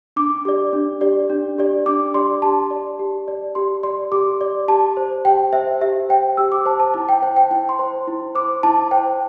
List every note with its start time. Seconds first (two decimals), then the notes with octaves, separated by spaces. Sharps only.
0.16 D4 D6
0.45 G4 D5
0.73 D4
1.01 G4 D5
1.30 D4
1.58 G4 D5
1.86 D4 D6
2.14 G4 D5 C6
2.42 G4 A5
2.71 D5
2.99 G4
3.28 D5
3.55 G4 C6
3.83 D5 C6
4.12 G4 D6
4.41 D5
4.68 G4 A5
4.97 C5
5.25 G4 G5
5.53 C5 E5
5.81 G4 E5
6.09 C5 G5
6.37 G4 E6
6.52 D6
6.66 C5 A5
6.80 A5
6.94 E4 A5
7.09 G5
7.22 C5 G5
7.37 G5
7.51 E4 G5
7.69 C6
7.79 C5
8.08 E4
8.35 C5 D6
8.63 E4 A5
8.91 C5 G5